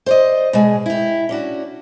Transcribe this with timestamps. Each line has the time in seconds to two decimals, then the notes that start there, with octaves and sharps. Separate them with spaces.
0.06 C5 D5 D#5
0.53 B2 G#3 G#4
0.86 E4 G4
1.29 C#4 D4 F#4